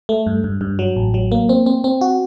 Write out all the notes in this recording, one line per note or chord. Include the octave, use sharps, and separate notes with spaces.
A3
G2
G2
G2
F#3
A1
F#3
A#3
C4
C4
C4
F#4